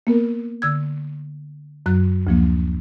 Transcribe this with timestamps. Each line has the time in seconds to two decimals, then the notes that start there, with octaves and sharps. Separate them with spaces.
0.07 A#3 B3 A#4
0.62 D3 E6 G#6
1.86 F#2 F#3 F#6
2.27 D2 F3 A#3